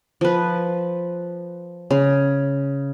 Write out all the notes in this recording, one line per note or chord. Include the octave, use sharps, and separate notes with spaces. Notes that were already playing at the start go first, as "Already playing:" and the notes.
F3 B4
C#3